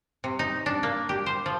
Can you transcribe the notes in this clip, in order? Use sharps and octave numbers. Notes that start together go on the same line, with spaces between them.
C3
D#4
D4
A#3
G4
C5
F3